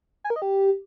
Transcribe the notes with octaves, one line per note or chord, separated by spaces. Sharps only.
G#5
A#4
D#5
G4